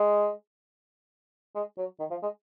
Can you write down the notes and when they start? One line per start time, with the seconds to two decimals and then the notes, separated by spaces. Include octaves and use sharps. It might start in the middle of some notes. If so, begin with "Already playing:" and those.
Already playing: G#3
1.55 G#3
1.78 F#3
2.00 D#3
2.10 F3
2.23 G#3